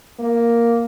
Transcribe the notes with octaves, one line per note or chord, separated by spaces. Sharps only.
A#3